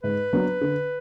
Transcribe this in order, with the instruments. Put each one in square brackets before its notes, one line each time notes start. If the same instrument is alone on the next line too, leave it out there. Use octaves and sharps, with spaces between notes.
[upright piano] G#2 [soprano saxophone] B4
[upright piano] F#3 B3 D4
D3